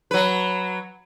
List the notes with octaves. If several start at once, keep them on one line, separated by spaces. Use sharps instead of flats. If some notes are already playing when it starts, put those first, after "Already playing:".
F#3 B4